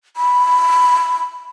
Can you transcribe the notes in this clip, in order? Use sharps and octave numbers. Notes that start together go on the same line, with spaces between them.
B5